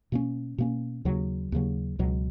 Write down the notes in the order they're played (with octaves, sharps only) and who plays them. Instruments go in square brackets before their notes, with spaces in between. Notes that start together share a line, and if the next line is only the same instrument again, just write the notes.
[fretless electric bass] B2 A#3 C#4
B2 A#3 C#4
D#2 C#3 F#3
D#2 C#3 F#3
C#2 B2 F#3